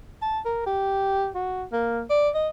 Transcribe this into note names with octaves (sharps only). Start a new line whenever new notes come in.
A5
A#4
G4
F#4
A#3
D5
D#5